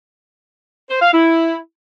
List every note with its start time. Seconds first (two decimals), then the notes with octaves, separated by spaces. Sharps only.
0.90 C5
1.02 F5
1.13 E4